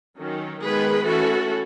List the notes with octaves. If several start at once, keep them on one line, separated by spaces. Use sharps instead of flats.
D#3 F#3 C#4
D#3 G#3 B3 G#4 B4
E3 A3 C#4 F#4 A4